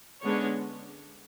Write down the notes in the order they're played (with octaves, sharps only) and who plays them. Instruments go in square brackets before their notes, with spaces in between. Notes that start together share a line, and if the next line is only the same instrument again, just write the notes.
[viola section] D3 G#3 B3 C#4 D4 C#5